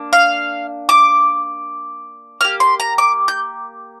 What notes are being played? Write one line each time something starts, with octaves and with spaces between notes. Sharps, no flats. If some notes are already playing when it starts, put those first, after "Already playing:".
Already playing: A#3 D4
F5
D6
A#3 G4 F6
C6
A#5
D6
G6